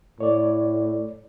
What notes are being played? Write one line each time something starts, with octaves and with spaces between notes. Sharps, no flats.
A2 C#5 D5